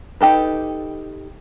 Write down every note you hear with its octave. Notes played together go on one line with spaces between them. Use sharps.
D#4 G4 A4 B4